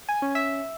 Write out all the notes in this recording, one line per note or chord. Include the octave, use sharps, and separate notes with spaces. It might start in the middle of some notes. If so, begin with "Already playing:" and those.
G#5
C#4
E5